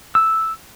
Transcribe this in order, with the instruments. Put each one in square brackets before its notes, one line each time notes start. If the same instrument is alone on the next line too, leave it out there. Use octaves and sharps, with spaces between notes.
[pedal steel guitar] E6